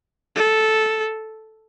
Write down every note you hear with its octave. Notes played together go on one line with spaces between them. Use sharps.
A4